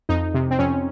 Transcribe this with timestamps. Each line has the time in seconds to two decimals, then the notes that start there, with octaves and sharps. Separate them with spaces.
0.09 F2 D#4
0.34 C3
0.51 C4
0.59 F2 C#4